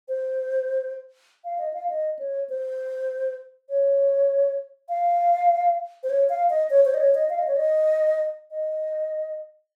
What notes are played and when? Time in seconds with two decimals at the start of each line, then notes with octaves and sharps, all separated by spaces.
0.08 C5
1.44 F5
1.58 D#5
1.73 F5
1.89 D#5
2.19 C#5
2.49 C5
3.69 C#5
4.89 F5
6.03 C5
6.10 C#5
6.29 F5
6.50 D#5
6.70 C#5
6.85 C5
6.94 D#5
7.00 C#5
7.15 D#5
7.29 F5
7.39 D#5
7.47 C#5
7.56 D#5
8.51 D#5